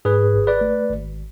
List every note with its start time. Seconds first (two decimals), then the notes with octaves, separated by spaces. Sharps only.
0.05 G#2 G#4 B4
0.34 G#1
0.47 B4 D5
0.61 A3
0.90 G#1